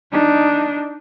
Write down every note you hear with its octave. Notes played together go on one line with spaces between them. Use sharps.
D4 D#4